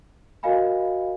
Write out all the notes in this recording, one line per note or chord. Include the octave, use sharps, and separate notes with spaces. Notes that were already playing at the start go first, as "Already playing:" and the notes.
F#4 A#4 D#5 F5 G#5 B5